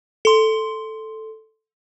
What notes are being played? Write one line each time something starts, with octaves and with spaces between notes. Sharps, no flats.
A4 C6